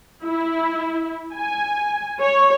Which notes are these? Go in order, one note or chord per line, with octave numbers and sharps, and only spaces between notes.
E4
G#5
C#5